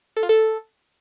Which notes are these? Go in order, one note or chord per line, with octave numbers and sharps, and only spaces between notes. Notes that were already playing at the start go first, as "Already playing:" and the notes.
A4
F4
A4